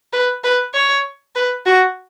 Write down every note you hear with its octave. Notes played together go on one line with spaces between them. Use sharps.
B4
B4
C#5
B4
F#4